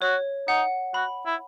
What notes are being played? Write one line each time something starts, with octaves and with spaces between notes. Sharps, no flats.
F#4 C#5
D#4 F#5
F#4 B5
E4